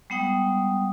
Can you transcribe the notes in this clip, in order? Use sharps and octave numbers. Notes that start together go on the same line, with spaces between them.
G3 G#3 B3 F#5 G5 D#6